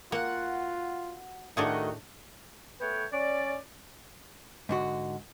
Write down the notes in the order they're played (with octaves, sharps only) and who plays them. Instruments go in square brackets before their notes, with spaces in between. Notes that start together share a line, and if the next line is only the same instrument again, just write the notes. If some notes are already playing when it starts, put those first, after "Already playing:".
[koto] A#3 [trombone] F4 [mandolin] F#4 F#5
[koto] A2 D4 G#4 [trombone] D#3 [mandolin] A3 F#4 D#5
[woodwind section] A3 B3 A4 B4 C#5 G5
C#4 D5
[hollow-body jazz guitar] G#2 D3 F#4